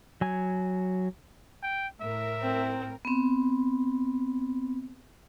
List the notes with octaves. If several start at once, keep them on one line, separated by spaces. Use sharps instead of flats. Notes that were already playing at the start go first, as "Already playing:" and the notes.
F#3 G#5
G5
A2 A#4 E5
C4
B3 C4